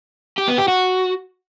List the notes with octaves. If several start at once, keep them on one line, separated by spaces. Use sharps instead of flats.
G4
B3
G4
F#4